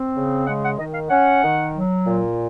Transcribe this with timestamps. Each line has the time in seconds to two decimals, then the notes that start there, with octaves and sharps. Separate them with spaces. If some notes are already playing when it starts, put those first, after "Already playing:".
Already playing: C4
0.15 C#3
0.46 G#3 F#5
0.63 F#5
0.78 D#3 D#5
0.94 F5
1.10 C#4 F#5
1.43 D#3
1.74 F#3
2.06 A#2